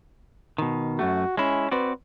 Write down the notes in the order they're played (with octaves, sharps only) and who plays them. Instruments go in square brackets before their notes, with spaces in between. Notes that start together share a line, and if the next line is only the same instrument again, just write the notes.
[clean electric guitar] B2 D#3
[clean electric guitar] F#2 A3 [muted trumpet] F#4
[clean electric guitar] G#3 E4 [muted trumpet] C#4
[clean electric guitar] C4 F#4 D5 [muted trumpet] B4